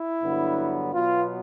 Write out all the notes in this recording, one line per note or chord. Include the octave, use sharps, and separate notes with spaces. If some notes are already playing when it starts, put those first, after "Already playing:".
Already playing: E4
G2 D3 F#3 B3
B2 F#3 B3 F4